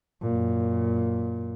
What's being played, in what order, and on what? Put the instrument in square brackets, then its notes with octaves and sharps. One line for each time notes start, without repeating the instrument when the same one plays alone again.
[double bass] F#2 A#2